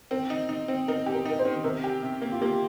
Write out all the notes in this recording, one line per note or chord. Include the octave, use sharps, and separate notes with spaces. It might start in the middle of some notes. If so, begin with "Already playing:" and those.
C4 A#4
D#4
D#4
C4
D#4 A#4
G4
A#4
D#4 A#4
C5
D#3
C3 A#4
G4
C3
A#3
F4
A#3 G4